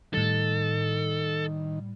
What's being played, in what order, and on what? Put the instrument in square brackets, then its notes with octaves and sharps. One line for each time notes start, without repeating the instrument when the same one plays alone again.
[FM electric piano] A2 G3 [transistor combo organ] D#3 [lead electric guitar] A4